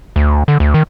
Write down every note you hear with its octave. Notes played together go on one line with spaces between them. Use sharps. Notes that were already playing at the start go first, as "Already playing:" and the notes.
D2
D3
D2
D#3